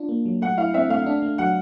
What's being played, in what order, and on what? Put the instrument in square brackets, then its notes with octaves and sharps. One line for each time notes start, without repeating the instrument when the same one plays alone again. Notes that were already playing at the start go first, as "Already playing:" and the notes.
Already playing: [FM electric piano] D4 F4
A#3
F#3
[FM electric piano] A3 [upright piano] F#5
[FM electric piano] E4 [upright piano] F5
[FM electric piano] C4 [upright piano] E5
[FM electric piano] A3 [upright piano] F5
[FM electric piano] D4
A3
[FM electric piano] F#3 [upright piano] F#5